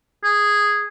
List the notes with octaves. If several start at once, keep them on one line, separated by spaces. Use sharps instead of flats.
G#4